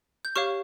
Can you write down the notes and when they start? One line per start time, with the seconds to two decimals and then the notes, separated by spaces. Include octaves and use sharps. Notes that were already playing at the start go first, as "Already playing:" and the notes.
0.25 G6
0.36 G4 C#5 F5 C#6 F6